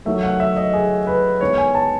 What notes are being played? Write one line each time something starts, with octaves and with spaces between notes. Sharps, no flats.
D#3 F#3 A3 E5
F#5
E5
D#5
G#4
B4
D#3 G#3 B3 C#5
G#5
A5